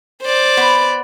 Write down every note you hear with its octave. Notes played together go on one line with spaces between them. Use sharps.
C5 D5
B3